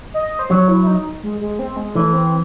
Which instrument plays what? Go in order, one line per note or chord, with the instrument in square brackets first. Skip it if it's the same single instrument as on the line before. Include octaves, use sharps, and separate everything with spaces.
[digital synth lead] D#5
C5
[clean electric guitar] F#3 [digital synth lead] C#5
[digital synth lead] E4
E4
D#4
G#3
G#3
C4
G#3
[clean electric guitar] E3 [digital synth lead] A3
[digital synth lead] C4